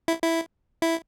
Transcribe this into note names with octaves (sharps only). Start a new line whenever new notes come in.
E4
E4
E4